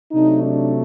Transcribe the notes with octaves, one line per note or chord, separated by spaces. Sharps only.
C3 F#3 A3 D4 D#4
D4